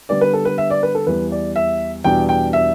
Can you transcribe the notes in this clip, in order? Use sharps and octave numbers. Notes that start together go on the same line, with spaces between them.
D3 G3 B3 D5
B4
A4
B4
E5
D5
B4
A4
E2 E3 G3 B4
D5
E5
E2 B2 G3 D4 G5
G5
E5